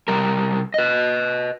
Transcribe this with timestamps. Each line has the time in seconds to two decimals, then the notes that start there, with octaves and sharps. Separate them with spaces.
0.08 C3 G3 A#4
0.74 B4 D#5